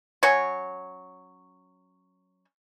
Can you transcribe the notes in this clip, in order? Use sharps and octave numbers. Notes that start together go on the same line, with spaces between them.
F#3 C#4 C#5